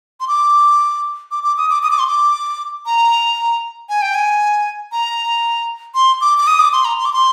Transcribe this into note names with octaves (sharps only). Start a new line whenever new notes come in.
C6
D6
D6
D6
D#6
D6
D#6
D6
C6
D6
A#5
G#5
G5
G#5
A#5
C6
D6
D6
D#6
D6
C6
A#5
C6
D6
C6